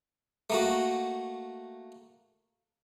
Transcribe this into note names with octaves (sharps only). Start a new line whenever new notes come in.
A3 A#3 F#4